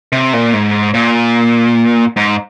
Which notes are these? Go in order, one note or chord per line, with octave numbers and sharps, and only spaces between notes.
C3
A#2
G#2
A#2
G#2